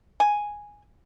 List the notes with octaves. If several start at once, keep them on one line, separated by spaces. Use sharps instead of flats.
G#5